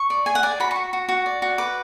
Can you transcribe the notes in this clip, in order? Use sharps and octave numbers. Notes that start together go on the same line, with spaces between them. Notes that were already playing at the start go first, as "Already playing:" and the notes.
Already playing: C#6
D5
G#4 G#5
F#5
D5 G#5
F#4 B5
F#4 C#6
F#4
F#4
D5
F#4
B4 D6